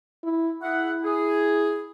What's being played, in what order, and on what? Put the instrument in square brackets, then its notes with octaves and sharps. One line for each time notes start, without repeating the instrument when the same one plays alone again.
[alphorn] E4
[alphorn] E4 [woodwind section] G#4 E5 F#5
[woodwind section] G#4